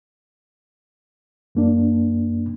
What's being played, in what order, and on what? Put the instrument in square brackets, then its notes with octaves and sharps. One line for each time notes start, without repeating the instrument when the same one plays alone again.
[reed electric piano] F#2 A#3 D4